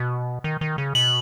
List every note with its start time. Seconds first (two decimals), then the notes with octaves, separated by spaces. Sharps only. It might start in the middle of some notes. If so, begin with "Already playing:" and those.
Already playing: B2
0.44 D#3
0.61 D#3
0.78 C#3
0.95 B2 F#7